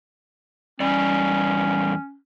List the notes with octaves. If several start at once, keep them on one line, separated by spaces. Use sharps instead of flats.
E2 G3 C#4 D5